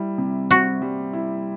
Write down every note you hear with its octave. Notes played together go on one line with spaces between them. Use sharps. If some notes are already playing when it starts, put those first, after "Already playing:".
Already playing: G3 E4
C3
C4 F#4
G3
E4